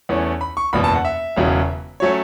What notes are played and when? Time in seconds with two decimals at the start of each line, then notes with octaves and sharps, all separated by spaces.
0.09 E2 E3 A3 C#4
0.41 B5
0.57 C#6
0.73 F#1 E2 B2 B5
0.84 A5
0.94 F#5
1.05 E5
1.36 E1 E2 C#3 F#3
2.00 F#3 A3 C#4 C#5